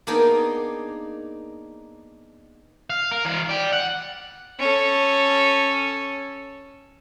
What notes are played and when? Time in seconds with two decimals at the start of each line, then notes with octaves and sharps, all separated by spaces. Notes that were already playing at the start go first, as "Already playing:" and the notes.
0.07 A#3 B3 D4 D#4 G#4 G5
2.90 F5
3.11 A#4
3.25 E3 F5
3.49 D5 G5
3.73 F#5
4.59 C#4 A4